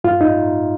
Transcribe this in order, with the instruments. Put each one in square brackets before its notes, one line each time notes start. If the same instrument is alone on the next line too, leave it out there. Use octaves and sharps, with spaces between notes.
[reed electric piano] G2 F4
D#4